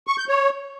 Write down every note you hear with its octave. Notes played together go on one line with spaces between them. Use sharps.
C#6
G6
C#5